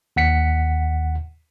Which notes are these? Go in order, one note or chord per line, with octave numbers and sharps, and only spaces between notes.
D#2 F#5 B6 C#7